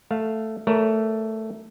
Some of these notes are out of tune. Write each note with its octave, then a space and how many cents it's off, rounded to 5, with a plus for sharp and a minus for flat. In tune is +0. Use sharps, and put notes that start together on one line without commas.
A3 +0 F5 +5
A3 +0 A#4 +0 C#5 +40